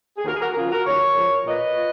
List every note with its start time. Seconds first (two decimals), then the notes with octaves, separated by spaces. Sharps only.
0.16 G#4
0.25 D#2 F#4 A#4
0.35 G#4
0.40 F#4 A#4
0.52 A#4
0.55 C#3 F3 F4 G#4
0.71 F#4 A#4
0.86 D#2 A#4 C#5
1.16 C#3 F3
1.47 A#2 B4 D#5
1.77 F4